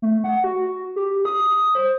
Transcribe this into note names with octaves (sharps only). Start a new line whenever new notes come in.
A3
F#5
F#4
G4
D#6
C5